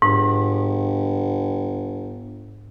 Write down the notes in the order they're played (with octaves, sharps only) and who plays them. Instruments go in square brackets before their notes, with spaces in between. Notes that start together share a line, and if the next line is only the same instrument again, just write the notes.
[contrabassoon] G1 [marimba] G#2